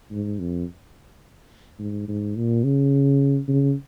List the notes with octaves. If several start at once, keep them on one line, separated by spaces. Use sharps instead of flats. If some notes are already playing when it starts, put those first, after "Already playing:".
G#2
F2
G#2
G#2
A#2
C#3
C#3